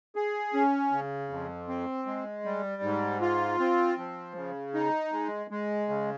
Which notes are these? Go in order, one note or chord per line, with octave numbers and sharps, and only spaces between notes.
G#4
C#4
C#3
F2
C4
G#3
G3
G#2
F4
C4
F3
C#3
D#4
G#3
G#3
C#3